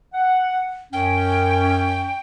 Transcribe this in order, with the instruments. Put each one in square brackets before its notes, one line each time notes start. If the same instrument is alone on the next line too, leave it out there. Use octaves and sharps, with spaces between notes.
[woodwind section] F#5
[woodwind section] F#2 C#4 [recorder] G5